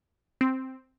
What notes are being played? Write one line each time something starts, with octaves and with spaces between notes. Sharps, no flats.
C4